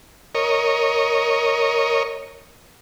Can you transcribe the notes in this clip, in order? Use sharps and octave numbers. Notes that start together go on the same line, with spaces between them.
A#4 C#5 D#5